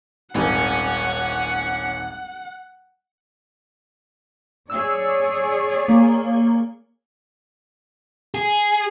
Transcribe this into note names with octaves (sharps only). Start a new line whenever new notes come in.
D#1 G#1 C#5 F#5 G#5
G#4 C#5 D5 E6
A#3
G#4